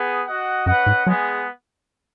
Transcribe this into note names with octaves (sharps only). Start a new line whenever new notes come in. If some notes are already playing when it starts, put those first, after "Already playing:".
Already playing: B3 G#4
F#4 D#5 F#5
F#2 C#4 B4 D#5 F#5
G#2
F#3 G#3 B3 G#4